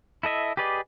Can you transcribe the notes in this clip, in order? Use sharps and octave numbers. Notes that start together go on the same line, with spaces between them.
E4 A4 D#5 E5
G4 G#4 B4 D5 D#5